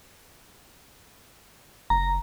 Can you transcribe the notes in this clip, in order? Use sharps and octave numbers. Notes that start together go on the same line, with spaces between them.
F#1 A#5